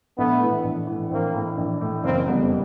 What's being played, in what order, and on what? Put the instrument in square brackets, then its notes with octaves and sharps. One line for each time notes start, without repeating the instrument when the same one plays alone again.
[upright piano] A#1 [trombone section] A3 B3
[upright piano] A2 E3
A#1
A2 E3
[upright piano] A#1 [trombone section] A#3 C4
[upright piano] A2 E3
A#1
A2 E3
[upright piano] F#1 [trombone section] A#3 C4
[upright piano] F2 D3 G3 B3